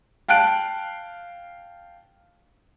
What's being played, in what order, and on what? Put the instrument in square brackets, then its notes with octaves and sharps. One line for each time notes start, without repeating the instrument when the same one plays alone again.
[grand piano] F5 G5 A5 F#6 D7